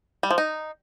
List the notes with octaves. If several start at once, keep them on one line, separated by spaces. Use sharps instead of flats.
G3
F3
D#4